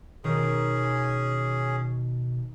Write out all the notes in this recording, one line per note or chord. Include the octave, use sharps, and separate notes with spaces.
B2 D#3 C#4 G#4 A#4